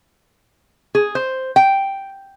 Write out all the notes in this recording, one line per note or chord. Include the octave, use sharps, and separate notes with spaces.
G#4
C5
G5